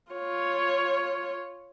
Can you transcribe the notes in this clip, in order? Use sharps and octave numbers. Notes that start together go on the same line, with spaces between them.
F4 C#5